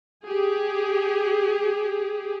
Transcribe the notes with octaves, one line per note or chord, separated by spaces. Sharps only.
G4 G#4